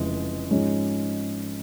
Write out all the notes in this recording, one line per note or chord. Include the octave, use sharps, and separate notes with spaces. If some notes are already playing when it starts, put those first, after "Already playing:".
Already playing: F1 F2 C#3 E3 G#3
G#2 F3 G#3 C#4